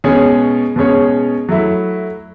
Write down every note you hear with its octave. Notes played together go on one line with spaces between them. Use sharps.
B2 G#3 C#4 G#4 C#5
B2 G#3 C#4 G#4 C#5
F#3 A3 E4